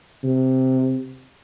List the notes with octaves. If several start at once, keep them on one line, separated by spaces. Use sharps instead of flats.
C3